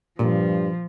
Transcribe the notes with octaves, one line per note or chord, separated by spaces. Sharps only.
G2 A#2 F3